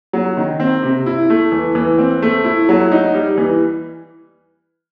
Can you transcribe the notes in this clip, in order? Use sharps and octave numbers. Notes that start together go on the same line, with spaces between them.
F#3
D#3
C4
C3
E4
A3
E3
E3
C4
A3
E4
F#3
D#4
G3
E3